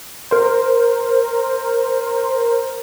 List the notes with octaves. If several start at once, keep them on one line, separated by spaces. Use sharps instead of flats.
A#4 C5